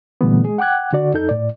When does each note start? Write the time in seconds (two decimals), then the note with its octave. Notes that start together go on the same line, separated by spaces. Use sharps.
0.21 A#2 D3 E3 G3 A3 B3
0.45 G#3 G#4
0.58 F#5 G5 D6 F#6 G#6
0.93 D3 F#4 D5
1.14 F2 D#4 A4 G6
1.29 A2 D5